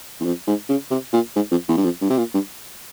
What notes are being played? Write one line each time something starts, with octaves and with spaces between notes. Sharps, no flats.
E2
F2
G#2
C#3
C3
A#2
G#2
F2
E2
G2
F2
G2
C3
A#2
G2